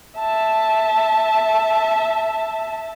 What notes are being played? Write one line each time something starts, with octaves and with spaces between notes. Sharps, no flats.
E5 A5